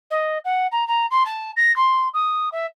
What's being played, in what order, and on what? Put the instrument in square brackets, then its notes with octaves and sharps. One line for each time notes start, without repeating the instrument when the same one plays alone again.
[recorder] D#5
F#5
A#5
A#5
C6
A5
A#6
C6
D#6
E5